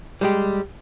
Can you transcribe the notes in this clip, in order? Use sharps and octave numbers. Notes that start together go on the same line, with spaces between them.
G3 G#3 G4